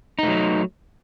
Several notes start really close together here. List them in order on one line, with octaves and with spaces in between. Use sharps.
D#4 A3 F#3